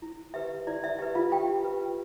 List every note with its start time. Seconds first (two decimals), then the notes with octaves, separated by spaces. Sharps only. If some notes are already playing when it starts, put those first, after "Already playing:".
0.02 E4
0.34 G4 B4 E5
0.67 E4 D5
0.84 E5
0.99 G4 B4 E5
1.15 F4 F5
1.31 F4 G4 G5
1.65 B4